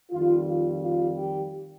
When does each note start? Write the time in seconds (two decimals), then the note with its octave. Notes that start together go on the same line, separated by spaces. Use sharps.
0.11 F2 D#3 G3 F4
0.47 F4
0.82 F4
1.17 G4